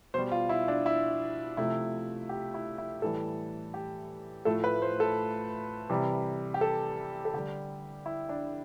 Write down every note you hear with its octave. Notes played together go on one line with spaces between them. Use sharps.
B2 G3 C5
F4
E4
D4
E4
C3 F3 A3 E4
G4
E4
E4
A2 E3 G3 A4
G4
A2 F3 A3 A4
B4
C5
A4
C3 E3 G3
G4
A4
A4
D3 G3 G4
E4
D4